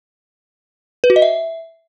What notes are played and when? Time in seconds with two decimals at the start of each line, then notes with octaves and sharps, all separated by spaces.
1.04 B4
1.10 F#4
1.16 D#5
1.22 E5